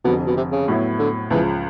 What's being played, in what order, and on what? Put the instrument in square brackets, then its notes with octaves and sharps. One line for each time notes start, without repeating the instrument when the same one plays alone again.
[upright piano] F1 F2 D3 [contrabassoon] B2
[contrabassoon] B2
C3
C#3
[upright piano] A2 F#3 B3 E4
[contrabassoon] D3
[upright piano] C#2 C#3 F3 [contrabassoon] E3